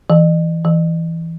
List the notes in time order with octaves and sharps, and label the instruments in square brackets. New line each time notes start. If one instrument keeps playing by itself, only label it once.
[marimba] E3
E3